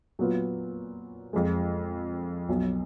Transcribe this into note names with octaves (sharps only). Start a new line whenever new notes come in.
A#2 F#3 B3 F4
F2 F3 G#3
B1 B2 F#3